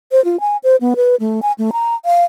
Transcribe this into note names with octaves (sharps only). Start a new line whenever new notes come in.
C5
F4
G#5
C5
B3
B4
A3
G#5
A3
A#5
F5